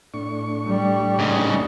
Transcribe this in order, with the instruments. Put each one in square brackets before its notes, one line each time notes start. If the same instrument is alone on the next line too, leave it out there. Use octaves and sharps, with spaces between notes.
[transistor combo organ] A2 D4 C#6
[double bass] G3
[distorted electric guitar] G#2 C#3